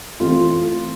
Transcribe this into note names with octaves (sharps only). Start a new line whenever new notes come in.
E3 A3 C4 F4